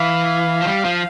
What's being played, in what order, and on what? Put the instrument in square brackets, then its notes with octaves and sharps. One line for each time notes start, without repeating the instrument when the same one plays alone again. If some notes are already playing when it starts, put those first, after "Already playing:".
Already playing: [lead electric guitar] E3 [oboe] F5
[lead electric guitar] F3
G3
F3